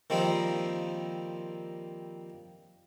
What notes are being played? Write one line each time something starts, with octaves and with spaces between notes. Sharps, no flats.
D#3 F3 G3 A#3 C4 D#4